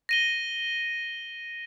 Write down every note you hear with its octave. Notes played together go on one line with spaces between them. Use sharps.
A#6 D#7 G7